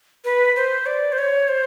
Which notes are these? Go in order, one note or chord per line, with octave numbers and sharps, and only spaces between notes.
B4
C5
D5
C5
C#5
C5